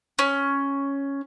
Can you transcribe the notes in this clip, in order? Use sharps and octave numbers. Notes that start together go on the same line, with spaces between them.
C#4